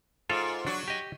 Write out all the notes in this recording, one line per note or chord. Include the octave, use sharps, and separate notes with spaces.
G#2 F4 A4 F5
F#3 D4 F#4
G4 D#5